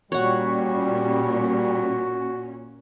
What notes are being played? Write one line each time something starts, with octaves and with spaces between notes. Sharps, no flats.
A#2 G3 C#4 F#4 C#5 F#5